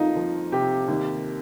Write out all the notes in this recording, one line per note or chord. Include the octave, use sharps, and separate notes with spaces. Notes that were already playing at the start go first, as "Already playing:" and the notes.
Already playing: F2 A#3 D#4 F4
F3
C3 G4
D#2